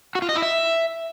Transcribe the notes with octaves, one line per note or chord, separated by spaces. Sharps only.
F#4
F4
D#5
E4
E5